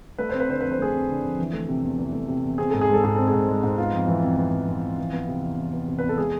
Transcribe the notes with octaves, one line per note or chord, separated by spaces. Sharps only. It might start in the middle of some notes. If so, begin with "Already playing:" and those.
A3 B4
C4 C5
B4
D3 C5
F2 B4
C5
A3 G#4 B4
C4
D3
F2
E3
A3
C3
E2
E3
A3
C3
E2
C4 G#4
G#2 A4
G#4
G#3 A4
G#2 G#4
C4 A4
G#4
G#2
G#3
G#2
B3 F4
F2
E3
F2
B3
F2
E3
F2
E3
B3
C3
E2
E3
B3
C3
B4
E2
A4
G#3 G#4